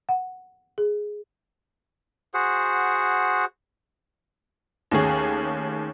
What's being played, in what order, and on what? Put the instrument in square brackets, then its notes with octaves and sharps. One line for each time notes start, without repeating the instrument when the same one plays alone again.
[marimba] F#5
G#4
[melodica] F#4 G#4 C5 F#5
[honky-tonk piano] D#2 A3 C#4 G#4